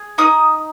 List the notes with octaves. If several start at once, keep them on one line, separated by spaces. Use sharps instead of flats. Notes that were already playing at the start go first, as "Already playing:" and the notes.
Already playing: G#4
D#4 D#6